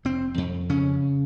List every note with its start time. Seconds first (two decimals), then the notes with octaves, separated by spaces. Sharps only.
0.05 F1 C4
0.38 F2
0.69 C#3 C#4